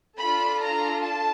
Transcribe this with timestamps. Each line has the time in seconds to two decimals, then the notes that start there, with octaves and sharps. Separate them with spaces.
0.18 D4 F4 A4 B5
0.60 A#5
1.00 A5